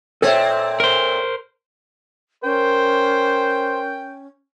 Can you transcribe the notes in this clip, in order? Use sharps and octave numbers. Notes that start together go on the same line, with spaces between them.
A#2 C4 A4 C#5 E5
A#4 C5
C#4 A#4 C5 G5